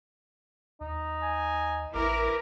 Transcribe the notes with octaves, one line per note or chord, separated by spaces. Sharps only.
D#2 D#4
G#5
A1 E4 A#4 B4 D6